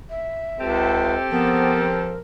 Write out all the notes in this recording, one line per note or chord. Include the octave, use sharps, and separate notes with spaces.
E5
C#2 C4 G4 A4
F3 B3 A#4